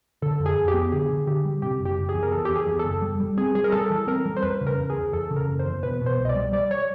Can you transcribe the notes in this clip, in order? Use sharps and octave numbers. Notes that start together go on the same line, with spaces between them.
D3 A4
F2
G#4
F2
G4
B3
G4
D3 G#4
D3
D3 G4
G3
C3 G4
F#1
G4
F#1
G#4
E2
A#4
E2 A4
E2 G4
G#4
E2
A4
F#1
G3
G3
C4 G#4
G3 G#4
A#4
G3 A4
E3
C4 A#4
G3
C5
E2 B4
C#3
A#4
E2
G#4
E2
E2 A4
C#3
A#4
F#1
C5
E2
B2 B4
B2
C5
C2
D#5
D5
G3
G3 D5
C#5